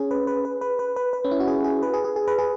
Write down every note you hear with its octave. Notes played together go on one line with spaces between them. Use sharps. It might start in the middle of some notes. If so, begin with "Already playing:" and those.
Already playing: C#4 G#4
B4
B4
B4
B4
B4
B4
B4
C#4
E4
F#4
G#4
G#4
B4
G#4
G#4
G#4
B4
G#4